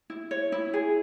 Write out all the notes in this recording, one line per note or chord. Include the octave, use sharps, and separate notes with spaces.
E4
C#5
E4
G#4